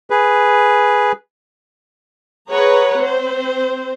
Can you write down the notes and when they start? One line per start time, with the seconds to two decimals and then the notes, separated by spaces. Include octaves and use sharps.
0.10 G#4 B4
2.50 G#4 B4 C#5 F#5 A#5
2.99 C4 C5